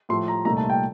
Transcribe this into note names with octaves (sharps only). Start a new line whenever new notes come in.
A2 F3 A3 C6
A#5
C2 A#2 A3 D#4 A#5
A5
G5